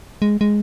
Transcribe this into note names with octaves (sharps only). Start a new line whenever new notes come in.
G#3
G#3